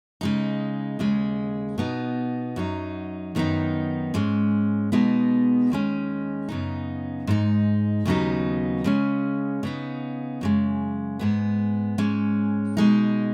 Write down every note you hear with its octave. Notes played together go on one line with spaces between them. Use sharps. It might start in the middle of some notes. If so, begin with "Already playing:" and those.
C#3 G#3 D#4
D#2 C#3 G#3
B2 B3 D#4
F#2 F#3 D#4
F#2 D#3 B3 D#4
G#2 G#3 C#4
B2 G#3 B3 D#4
D#2 D#3 G#3 C#4
F#2 C#3 B3 D#4
G#2 G#3 D#4
D#2 C#3 F#3 B3 D#4
C#3 G#3 C#4
C#3 B3 D#4
F#2 C#3 G#3
G#2 G#3 B3
G#2 G#3 C#4
B2 G#3 D#4